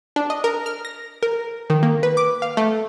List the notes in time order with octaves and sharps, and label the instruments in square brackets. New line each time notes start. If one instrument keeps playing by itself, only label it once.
[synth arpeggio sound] D4
D#5
A#4
F6
A#6
A#4
D#3
A#3
B4
D6
F5
A3